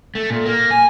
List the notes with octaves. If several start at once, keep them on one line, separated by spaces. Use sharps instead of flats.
A3
A#2
A#3
G#5